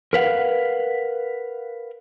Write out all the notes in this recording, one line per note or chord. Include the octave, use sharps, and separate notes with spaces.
A#4 B4 F5 F#5